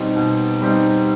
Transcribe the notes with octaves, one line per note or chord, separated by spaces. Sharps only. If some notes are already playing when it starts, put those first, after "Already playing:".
Already playing: B2 G3 C4 D#4
B2
G3 C4 D#4